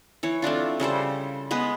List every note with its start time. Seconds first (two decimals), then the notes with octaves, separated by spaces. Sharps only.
0.23 E3 C#5
0.42 A3 C4 D4 F4
0.80 C#3 G3 A4 C5
1.51 G#3 B3 B4